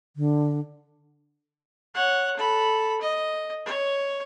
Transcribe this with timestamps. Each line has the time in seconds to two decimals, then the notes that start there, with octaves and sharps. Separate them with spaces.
0.16 D3
1.94 C#5 F#5
2.36 A4 B5
3.01 D#5
3.65 C#5